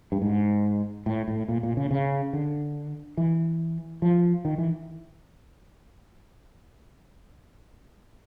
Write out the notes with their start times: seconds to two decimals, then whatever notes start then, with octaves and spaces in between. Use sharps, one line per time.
0.12 G2
0.22 G#2
1.06 A2
1.28 A2
1.48 A#2
1.63 A#2
1.77 C#3
1.91 C#3
2.33 D3
3.17 E3
4.02 F3
4.45 D#3
4.58 E3